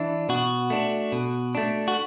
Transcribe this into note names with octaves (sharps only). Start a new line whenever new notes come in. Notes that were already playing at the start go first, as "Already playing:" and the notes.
Already playing: E3 D4 E5
B2 F#4
A3 D4
B2
A3 D4
F#4